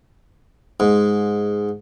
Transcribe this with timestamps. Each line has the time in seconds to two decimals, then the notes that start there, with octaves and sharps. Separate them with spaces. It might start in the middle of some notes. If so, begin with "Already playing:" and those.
0.80 G#2